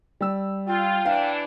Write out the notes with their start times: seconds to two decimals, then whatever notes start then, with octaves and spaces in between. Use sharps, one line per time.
0.21 G3 E6
0.68 F4 G5
1.05 E3 D4 F5